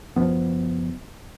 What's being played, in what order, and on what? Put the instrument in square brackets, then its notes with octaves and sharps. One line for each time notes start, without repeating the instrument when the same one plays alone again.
[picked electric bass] F#1 F3 B3